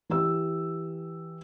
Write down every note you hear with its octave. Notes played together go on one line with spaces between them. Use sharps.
E3 G4 E6